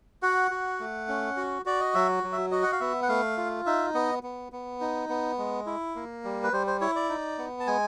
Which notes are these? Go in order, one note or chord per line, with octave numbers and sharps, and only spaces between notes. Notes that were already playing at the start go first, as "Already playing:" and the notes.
F#4 F#5
F#4
A3
C#4
F#4
F#4 D5
D#5
F#3 E5
F#3
E5
F#4 D#5
F#5
F5
B3 E5
F#5
A3 F5
F4
D#4 E5
B3 D#5
B3
B3
D#4
B3
G#3
E4
A#3
G3
B4
G3 C5
C5
E4 C#5
D5
D#4
B3
A5
G#3 G#5